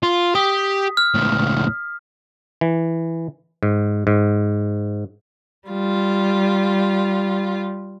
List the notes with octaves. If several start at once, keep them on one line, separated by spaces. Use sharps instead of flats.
F4
G4 D#6 B6
F6
C#2 A2
E3
G#2
G#2
G3 F4